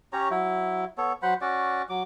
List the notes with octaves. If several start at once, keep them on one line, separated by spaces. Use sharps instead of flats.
C#4 G4 C#5 A#5
F#3 E4
B3 A4 C#5
F#3 C5 F#5 B5
C#4 F#4 D5
F#3 D6